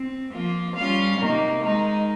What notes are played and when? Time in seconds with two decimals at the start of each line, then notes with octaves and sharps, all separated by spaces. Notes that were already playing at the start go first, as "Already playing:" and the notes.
Already playing: C4
0.33 F3 A#3 F4
0.75 G3 C#4 F4 F5
1.18 C3 D#3 A#3 D#4
1.61 D#3 G#3 D#4